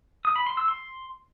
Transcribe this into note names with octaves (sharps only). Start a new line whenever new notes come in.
D#6
B5
C6
E6
C6